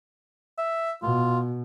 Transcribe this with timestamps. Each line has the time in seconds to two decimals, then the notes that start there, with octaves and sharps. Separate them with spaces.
0.58 E5
1.03 B2 F4